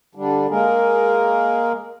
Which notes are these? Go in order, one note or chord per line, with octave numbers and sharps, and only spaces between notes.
D3 G3 D4
G#3 A#3 G#4 A#4